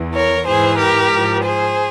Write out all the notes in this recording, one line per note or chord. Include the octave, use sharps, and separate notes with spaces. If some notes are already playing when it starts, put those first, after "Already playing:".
Already playing: E2 E3
A#4 C#5
G#2 E3 G#4 C5
G4 A#4
G#2 F3
G#4 C5